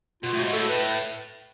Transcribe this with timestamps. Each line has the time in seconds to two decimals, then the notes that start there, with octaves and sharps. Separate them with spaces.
0.23 B2 F4
0.33 A2
0.38 G#2 F#4
0.53 A2 A4
0.69 B4